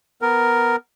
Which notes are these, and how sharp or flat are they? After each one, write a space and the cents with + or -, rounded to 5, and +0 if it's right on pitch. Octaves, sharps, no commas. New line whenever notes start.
B3 +0 A#4 +0